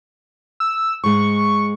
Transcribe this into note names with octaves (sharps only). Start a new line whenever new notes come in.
E6
G#2 G#3 C#6